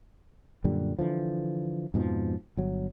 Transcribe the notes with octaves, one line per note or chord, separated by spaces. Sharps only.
F#2 A#2 D3 G3
D3 E3 F3
F2 G#2 B2 F3
G1 F#3